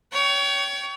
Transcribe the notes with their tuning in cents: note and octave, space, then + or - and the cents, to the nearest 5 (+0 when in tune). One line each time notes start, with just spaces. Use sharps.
C#5 +25 G5 -20